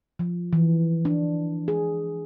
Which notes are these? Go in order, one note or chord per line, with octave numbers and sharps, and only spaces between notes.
F3
E3
D4
G#4